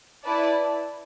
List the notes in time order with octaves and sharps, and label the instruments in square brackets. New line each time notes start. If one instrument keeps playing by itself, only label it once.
[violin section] E4 B4 D5 A5